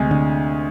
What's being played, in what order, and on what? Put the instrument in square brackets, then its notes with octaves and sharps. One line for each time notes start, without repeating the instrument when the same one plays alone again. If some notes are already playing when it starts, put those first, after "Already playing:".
Already playing: [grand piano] D2 C3 G#3
[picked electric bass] D3